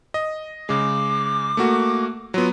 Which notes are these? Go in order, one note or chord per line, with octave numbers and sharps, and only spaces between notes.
D#5
C#3 G#3 D6
A3 A#3 F#4
F#3 B3 F4